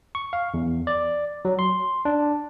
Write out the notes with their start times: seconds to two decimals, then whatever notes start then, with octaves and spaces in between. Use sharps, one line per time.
0.15 C#6
0.33 F5
0.54 E2
0.87 D5
1.45 F#3
1.59 C6
2.05 D4